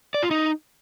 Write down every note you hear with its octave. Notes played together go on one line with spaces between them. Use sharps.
D5
F4
D#4